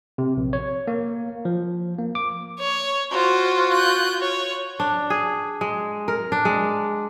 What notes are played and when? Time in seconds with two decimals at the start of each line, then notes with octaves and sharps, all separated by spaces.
0.18 C3
0.37 A#1
0.53 C#5
0.87 A#3
1.45 F3
1.98 A#3
2.15 D6
2.60 C#5
3.12 F4 F#4 C5
3.74 F#6 G6
4.21 C#5
4.80 D4
5.10 G#4
5.61 G#3
6.08 A#4
6.32 D4
6.45 G#3